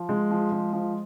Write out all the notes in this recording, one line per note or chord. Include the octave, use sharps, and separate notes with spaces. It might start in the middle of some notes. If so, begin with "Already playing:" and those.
Already playing: F3
G#3
F3
G#3
F3